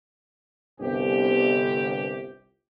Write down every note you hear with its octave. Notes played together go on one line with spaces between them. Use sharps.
G1 C2 G4